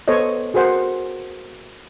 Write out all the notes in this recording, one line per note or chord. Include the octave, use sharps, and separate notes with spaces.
B3 A4 C5 C#5 D#5
F#4 G#4 A#4 C5 F#5